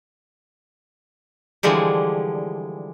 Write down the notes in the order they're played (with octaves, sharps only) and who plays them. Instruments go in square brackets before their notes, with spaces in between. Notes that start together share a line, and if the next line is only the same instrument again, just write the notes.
[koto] D3 E3 F3 G3 G#3